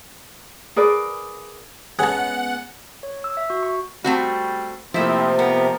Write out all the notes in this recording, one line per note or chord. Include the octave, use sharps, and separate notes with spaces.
G#4 A#4 B4 D5
G#3 B3 C#4 G#4 F#5 A5
C#5
E6
E5
F#4
C#6
G3 A3 C4 F#4
C3 F3 A3 A#3 C4 E4 E5
B3 A#4